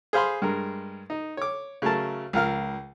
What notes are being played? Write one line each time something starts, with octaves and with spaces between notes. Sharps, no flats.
G#4 C5 F5 B5 C6
G2 G#3 A#4
D#4
C#5 D6
C#3 F#3 A3 A#4 A5
C#2 F3 A#4 F5 F6